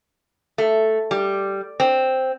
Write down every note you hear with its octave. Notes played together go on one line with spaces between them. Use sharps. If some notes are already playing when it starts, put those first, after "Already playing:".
A3
G3
C4